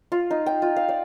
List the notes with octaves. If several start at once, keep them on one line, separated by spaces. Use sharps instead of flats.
F4
D#4
G5
F4
F5
D5